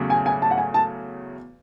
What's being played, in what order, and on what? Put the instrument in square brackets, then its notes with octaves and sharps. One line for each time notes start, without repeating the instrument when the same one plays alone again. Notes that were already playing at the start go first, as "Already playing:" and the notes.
Already playing: [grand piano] E2 C#3 F#3 A3
[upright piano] G#5
G#5
A5
F#5
G#5
A5